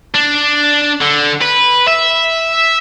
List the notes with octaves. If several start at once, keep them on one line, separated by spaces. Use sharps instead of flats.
D4
D3
B4
E5